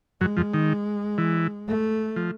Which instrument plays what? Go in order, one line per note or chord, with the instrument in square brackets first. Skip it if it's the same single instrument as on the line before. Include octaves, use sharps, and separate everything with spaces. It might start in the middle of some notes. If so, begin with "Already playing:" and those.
[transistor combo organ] F#2 F#3 [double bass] G#3
[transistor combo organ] F2 F3
D#3
E3
[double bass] A3
[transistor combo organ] F3